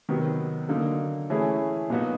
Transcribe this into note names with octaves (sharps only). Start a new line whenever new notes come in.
C3 D#3 F#3 B3
D3 F#3 A#3 D#4
E3 A3 C#4 E4 G#4
A#2 F#3 B3 D#4 F#4